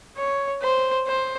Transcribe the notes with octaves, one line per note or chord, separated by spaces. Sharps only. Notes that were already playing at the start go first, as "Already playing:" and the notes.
C#5
C5
C5